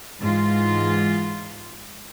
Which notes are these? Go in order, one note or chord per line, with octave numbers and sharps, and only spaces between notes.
G#2 E3 F4